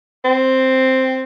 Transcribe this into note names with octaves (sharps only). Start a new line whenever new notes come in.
C4